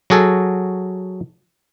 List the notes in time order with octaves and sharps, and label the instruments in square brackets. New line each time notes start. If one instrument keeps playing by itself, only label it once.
[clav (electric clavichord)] F#3 F#4 G#4 A4